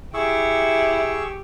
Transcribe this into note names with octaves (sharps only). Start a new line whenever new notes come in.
E4 G4 G#4 C#6 E6